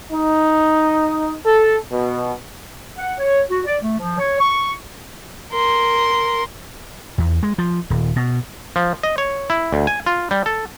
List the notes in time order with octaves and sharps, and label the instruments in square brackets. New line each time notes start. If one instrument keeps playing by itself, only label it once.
[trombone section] D#4
A4
B2
[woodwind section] F#5
C#5
F#4
D5
A3
F3
C#5
C#6
[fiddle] A#4 C6
[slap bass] E2
G#3
F3
D#1
B2
[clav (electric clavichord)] F3
D#5
C#5
E4
D2
G#5
F4
G3
A4